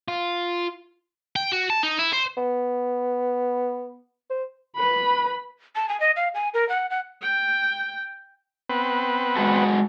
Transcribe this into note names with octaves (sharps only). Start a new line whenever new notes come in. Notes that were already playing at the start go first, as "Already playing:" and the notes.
F4
G5
F#4
A5
D#4
E4
C5
B3
C5
B4 B5
A5
G#5
D#5
F5
G#5
A#4
F#5
F#5
G5
B3 C4 B4
G#3 F#4 A4